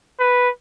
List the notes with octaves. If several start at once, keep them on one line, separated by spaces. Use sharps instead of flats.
B4